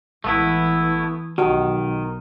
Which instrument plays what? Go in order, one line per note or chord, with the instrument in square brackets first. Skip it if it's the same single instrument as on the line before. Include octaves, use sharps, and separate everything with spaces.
[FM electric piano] A1 G#2 [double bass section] E3 [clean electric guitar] A3 B3 E4
[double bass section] B1 [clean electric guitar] D#3 [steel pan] F#4 G4 D#5 [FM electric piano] F6